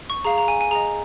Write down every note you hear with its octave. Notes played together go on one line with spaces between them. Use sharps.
C#6
G#4 F5 A#5
A#5
G#5
G#5
G#4 D#5 A#5